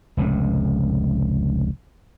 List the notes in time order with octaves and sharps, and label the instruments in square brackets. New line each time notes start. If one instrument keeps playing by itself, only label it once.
[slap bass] F1 C#2 A2